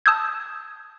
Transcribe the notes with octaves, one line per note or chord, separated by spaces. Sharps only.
A5 D#6 E6 G6 G#6